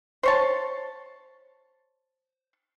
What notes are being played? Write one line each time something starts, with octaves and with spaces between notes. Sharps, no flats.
C5 C#5 A5